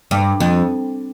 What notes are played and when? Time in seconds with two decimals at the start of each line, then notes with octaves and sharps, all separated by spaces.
0.11 G2
0.40 F2